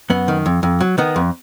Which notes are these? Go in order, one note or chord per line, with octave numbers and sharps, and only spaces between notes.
F#2 B3
D#3
F2
F2
F#3
D#3 B3
F2